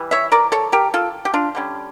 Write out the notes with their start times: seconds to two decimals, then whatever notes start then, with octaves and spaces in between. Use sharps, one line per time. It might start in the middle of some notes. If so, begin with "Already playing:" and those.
Already playing: E3 G3
0.11 C#5 E5
0.32 A#4 D5
0.52 A4 C#5
0.72 G4 A#4
0.94 F4 A4
1.25 G4
1.34 D4 F4
1.55 D3 G3 C#4